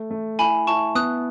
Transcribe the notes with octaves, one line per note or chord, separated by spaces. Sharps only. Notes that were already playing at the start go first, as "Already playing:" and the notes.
Already playing: A3
A3
E4 G#5 B5
E4 A5 C#6
B3 D#6 F#6